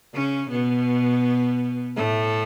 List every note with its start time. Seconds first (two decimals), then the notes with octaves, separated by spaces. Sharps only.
0.14 C#3 C#4
0.51 B2 B3
1.97 A2 A3